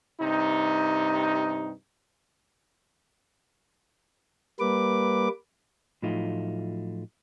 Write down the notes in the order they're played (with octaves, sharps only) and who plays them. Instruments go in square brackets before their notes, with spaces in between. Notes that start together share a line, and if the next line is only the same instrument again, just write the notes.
[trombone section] G2 C3 D#4
[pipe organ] G3 A#3 B4 D6
[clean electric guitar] A2 F3 F#3 A3 D#4 F4